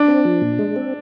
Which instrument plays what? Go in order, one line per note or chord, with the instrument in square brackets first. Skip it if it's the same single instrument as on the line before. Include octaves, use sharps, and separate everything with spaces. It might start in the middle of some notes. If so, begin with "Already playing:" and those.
Already playing: [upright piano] D4
[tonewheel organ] C4
F3
A#2
G#3
C4